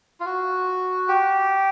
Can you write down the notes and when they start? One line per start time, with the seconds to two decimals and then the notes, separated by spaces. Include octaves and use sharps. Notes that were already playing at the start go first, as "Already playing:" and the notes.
0.20 F4
0.26 F#4
1.08 G4